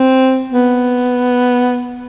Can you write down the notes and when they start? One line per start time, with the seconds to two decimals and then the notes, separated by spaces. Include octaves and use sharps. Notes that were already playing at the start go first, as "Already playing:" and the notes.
Already playing: C4
0.50 B3